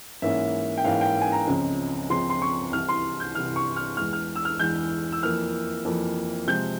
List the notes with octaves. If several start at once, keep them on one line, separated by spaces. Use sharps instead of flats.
G#2 E3 A#3 C#4 E5
G5
G#2 E3 A#3 C#4 F5
G5
G#5
A#5
C#2 C#3 F3 C4
C#2 C#3 F3 C4 C6
C6
C#6
C2 C3 E3 F6
C6
G6
C2 C3 E3 F6
C#6
F6
E2 E3 G#3 F6
F6
E6
F6
E2 E3 G#3 G6
E6
F2 E3 A#3 F6
F2 E3 A#3
C3 F3 G#3 C4 G6